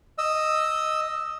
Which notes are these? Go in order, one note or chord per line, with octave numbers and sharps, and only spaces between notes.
D#5 E6